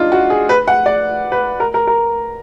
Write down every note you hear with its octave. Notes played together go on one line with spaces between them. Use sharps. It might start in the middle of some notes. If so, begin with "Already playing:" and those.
Already playing: D4 D#4 F4
F#4
G#4
B4
F#5
D5
B4
A#4
A#4
A#4